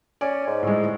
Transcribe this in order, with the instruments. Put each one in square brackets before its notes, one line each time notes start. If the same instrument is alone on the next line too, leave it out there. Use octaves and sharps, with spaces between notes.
[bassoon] C#4 [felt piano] D5
[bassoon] G#2
[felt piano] A2 G#3